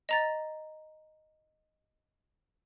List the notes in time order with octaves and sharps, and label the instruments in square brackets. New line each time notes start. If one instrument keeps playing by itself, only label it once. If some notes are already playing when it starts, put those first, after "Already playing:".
[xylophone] D#5 A#5 A6